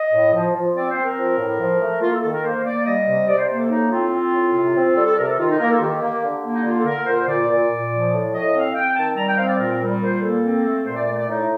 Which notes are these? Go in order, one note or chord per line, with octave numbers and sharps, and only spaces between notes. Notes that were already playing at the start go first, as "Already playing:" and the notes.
Already playing: D#5
A2
F3
F3
C4 D5
C5
C4
A#4
F3
A2
F3
A3
A#3 F4
A4
D#3 A4
A#4
A#3 C5
A#3 D5
G3 D#5
C3
C3 D5
C5
A#3 C5
A4
A2 D#4
C4 F4
C4
A2
C3
C4
G3 A4
A4
C3 A#4
A4
D#3 F4
D#4
A#3 A#4
A4
F4
D#3 G4
A#3
D3
A#3
D#4
D3 F4
A4
D3 A#4
A#2 C5
A#2 D5
A#2
A#2
F3
A2
A2 D#5
C4 F5
C4 G5
D#3 A5
A5
G3 A#5
G5
C4 F5
D5
A#2 A#4
G3
A#2 C5
A#3 A4
C4
A3
A#2 C5
D5
A3 D5
D5
A2 D#4